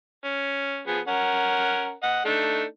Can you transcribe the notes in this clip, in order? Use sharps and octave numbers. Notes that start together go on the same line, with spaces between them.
C#4
F3 B3 G#4
C#4 A#4 F#5
D#5 F#5
A3 D4 D#4